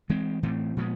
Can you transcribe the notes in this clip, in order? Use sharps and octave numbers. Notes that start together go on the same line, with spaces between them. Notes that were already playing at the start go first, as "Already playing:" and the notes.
E3 G#3 C4
A2 E3 A3 C4
A#2 F3 G#3 B3